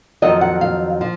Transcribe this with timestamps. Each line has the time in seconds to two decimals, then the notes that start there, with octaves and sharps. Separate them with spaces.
0.22 F2 D#3 F#3 D#5
0.41 F#5
0.61 F5
1.01 F3